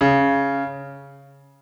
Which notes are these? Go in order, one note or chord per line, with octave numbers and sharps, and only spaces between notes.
C#3